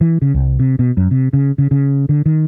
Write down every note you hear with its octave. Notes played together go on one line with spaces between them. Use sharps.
E3
C#3
C2
C3
B2
F#2
C3
C#3
C#3
C#3
D3
D#3